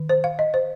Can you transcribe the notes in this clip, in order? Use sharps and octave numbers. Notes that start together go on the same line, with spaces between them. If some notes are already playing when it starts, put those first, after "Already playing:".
Already playing: D#3
C5
F5
D#5
C5